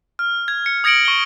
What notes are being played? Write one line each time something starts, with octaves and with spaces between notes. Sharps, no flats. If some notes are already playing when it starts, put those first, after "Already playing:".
F6
G#6
C#7
D#6 G#6 A#6 C#7 D7 F#7
C#6 G7